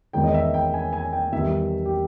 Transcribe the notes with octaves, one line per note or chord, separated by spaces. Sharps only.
E2 D#3 G#3 G5
D#5
E5
G5
G#5
G#5
G5
E2 D#3 G3 E5
G4